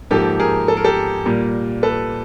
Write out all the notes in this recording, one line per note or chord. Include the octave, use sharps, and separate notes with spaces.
G#2 F3 A#3 G4 A4
G#4 A#4
A4
A#4
G4 A4
A#2 G3 A#3
A4 B4